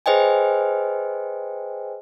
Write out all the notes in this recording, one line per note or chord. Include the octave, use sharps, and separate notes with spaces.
G#4 B4 C5 D#5 G5 G#5